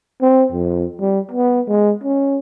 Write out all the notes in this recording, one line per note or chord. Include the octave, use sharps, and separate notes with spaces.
C4
F2
G3
B3
G#3
C#4